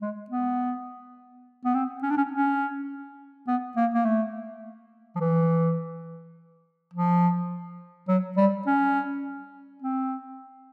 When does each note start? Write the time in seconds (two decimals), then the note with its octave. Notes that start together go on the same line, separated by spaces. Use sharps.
0.02 G#3
0.30 B3
1.65 B3
1.75 C4
2.03 C#4
2.10 D4
2.17 C#4
2.32 C#4
3.47 B3
3.77 A#3
3.94 A#3
4.05 A3
5.16 F3
5.20 E3
6.94 F3
8.08 F#3
8.37 G3
8.67 C#4
9.82 C4